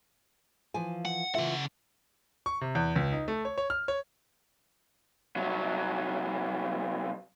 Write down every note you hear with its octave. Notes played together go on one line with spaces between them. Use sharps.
E3 F3 G#5
F#5
C#3 E3 F4 E5 F#5
C#6
C3
E2
C#2
D#4
A3
C#5
C#5
F6
C#5
C2 F#3